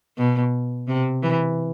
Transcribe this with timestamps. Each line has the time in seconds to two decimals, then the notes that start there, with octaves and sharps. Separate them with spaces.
0.17 B2
0.88 C3
1.23 E3